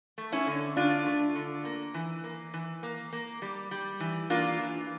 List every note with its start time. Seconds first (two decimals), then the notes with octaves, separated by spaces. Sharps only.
0.18 A3
0.32 C#4 E4
0.47 D3
0.77 D3 D4 F4
1.06 A3
1.35 D3
1.65 A#3
1.94 E3
2.24 A#3
2.54 E3
2.83 A#3
3.13 A#3
3.42 G3
3.71 G3
4.00 E3
4.30 A#3 D4 F4
4.59 E3